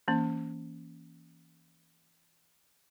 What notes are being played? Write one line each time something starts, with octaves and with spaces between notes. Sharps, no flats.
E3 A#3 C#4